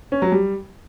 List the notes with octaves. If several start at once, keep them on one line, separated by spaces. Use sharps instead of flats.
C#4
F#3
G3